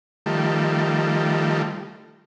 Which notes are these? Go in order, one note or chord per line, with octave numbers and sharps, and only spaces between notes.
D#3 F3 G3 A3